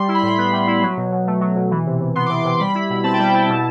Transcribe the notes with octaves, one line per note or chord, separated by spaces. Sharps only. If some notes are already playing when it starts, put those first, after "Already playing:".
Already playing: G3 C6
E4
B5
A2
B3
G3
E4
F#3
B2
B2
A3
F#3
B2
E3
C3
C3
B3 C6
E3 D6
C6
C3
G3 B5
E4
B2
C4 A5
G5
G3 A5
E4
B2